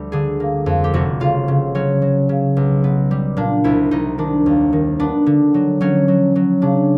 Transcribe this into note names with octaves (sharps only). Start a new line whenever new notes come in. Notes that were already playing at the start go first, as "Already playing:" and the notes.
Already playing: D2 G3
D3 G#4
A#3
F2
G4
F1 F#4
C#3 F4
C#3
F#3 C#4
F#3
C#3
B1
B3
G3
A#2 D4
C2 E4
C2 D#4
D#3 D4
D#2
D#3
B3 D4
D3
F#3
F#3 C#4
F#3
F#3
C#3 D4